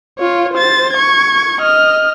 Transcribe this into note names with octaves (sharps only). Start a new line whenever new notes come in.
F4 C#5
C5 A6
C#6 G#6
D#5 F6